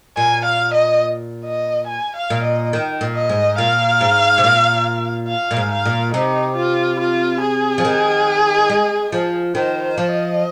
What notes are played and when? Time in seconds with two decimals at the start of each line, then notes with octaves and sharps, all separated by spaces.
0.17 A#2 G#5
0.45 F5
0.74 D#5
1.45 D#5
1.87 G#5
2.16 F5
2.30 A#2
2.44 D#5
2.73 D#3
3.01 A#2
3.15 D#5
3.29 G#2
3.58 A#2 F5
4.01 G#2
4.38 C3
4.44 A#2
5.28 F5
5.51 A#2
5.56 G#2
5.72 F5
5.85 A#2
6.13 C3 D#4
6.56 F4
7.00 F4
7.41 G#4
7.78 F3
7.85 D#3
8.70 G#3
9.12 F3
9.55 D#3 C5
9.83 C5
9.98 F3
10.12 D#5